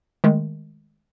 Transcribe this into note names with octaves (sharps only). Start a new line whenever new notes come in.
D#3 G#3 A3